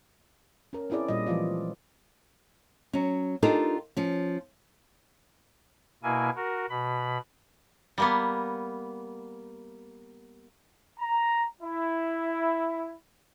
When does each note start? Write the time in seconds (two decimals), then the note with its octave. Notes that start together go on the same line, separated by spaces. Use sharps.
0.73 C#4 A#4
0.90 C4 C#4 E4 G#4 D5
1.08 A#2 G3 D#5
1.26 E3 F3 G#3 F4 D5
2.93 F#3 C#4
3.42 D4 D#4 F4 G4 A4 A#4
3.97 F3 C#4
6.03 B2 A#3 E4 G#5
6.36 F#4 A#4
6.70 B2 B5
7.98 G3 A#3 B3
10.99 A#5
11.61 E4